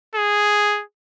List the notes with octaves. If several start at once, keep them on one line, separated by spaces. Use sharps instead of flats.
G#4